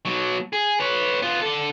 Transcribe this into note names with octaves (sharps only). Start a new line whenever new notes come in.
B2 F#3
G#4
B4 C#5
B3 F4
D3 A4